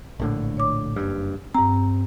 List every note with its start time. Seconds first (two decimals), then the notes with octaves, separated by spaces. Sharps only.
0.19 A#1 A2 D3
0.57 C#5 D6
0.96 F#1 G2
1.54 G2 C4 A#5